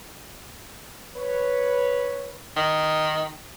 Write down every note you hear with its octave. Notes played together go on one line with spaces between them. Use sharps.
B4 C#5
D#3